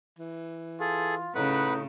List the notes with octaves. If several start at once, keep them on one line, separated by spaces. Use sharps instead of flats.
E3
F4 G#4 A4
A2 C#3 D#4 B4 F#5 B5